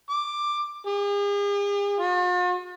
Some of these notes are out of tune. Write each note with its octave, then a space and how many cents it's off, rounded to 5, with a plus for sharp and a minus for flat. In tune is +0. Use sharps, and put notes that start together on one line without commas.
D6 +10
G#4 -45
F4 +45